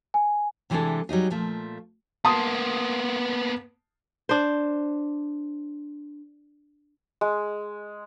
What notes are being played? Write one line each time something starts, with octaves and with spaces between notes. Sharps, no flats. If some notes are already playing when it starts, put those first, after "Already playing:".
G#5
C3 E3 G#3 D4 G#4 A4
F#3 G3 D#4 G#4
A#2 F3 A3
A#3 B3 A5 C6 D#6
D4 C5
G#3